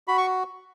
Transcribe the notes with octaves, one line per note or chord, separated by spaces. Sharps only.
F#4 B5
C#6